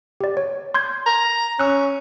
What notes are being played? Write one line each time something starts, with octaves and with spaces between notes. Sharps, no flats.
G4 D5
C#5
C6 G6 G#6
A#5
C#4 E6 F#6